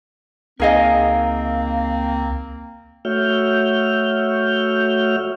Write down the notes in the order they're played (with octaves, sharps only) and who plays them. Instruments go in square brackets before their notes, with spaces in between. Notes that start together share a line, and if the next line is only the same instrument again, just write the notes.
[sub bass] C#2 [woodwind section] A#3 C4 [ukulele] D#4 G#4 D#5 [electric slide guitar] A#4 F5
[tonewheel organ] A3 F#4 C#5 E5 F6 G6